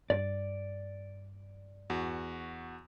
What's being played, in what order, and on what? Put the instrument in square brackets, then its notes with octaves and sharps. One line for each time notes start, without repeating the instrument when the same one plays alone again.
[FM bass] G2 [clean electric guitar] D5
[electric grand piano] E2 F#4